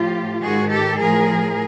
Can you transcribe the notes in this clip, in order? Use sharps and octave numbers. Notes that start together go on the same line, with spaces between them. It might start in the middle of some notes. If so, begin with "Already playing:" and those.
Already playing: A2 F3 F4 G4
G#2 D#3 F#4 G#4
G4 A4
A2 F3 G#4 A#4